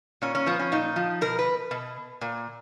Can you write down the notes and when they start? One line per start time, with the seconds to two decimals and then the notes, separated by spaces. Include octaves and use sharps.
0.22 A#2 C#4
0.35 C#4
0.46 F3 B3
0.59 C#4
0.72 A#2 D#4
0.96 F3
1.21 B2 A#4
1.39 B4
1.71 B2
2.21 A#2